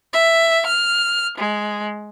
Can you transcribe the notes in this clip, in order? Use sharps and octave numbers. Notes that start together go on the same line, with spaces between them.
E5
F6
G#3